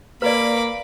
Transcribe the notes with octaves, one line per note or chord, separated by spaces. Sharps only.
A#3 B4 D5 B5 D6